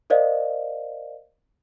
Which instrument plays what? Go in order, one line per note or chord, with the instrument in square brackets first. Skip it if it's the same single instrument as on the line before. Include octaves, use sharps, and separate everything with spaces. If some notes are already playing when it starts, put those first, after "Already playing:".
[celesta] A#4 C5 D5 D#5 F5